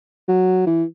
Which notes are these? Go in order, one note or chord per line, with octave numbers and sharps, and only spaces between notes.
F#3
E3